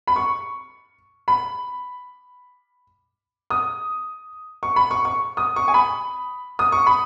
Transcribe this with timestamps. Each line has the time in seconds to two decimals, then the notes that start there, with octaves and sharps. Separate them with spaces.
0.07 B5
0.16 C#6
1.28 B5
3.50 D#6
4.63 C#6
4.76 B5
4.91 C#6
5.05 C#6
5.37 D#6
5.56 C#6
5.68 G#5
5.74 B5
6.59 D#6
6.72 C#6
6.87 B5